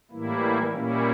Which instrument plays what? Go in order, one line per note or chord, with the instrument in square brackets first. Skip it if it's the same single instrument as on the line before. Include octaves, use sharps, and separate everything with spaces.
[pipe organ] A2 E3 G3 A#3 E4
A#2 G3 A#3 C#4 E4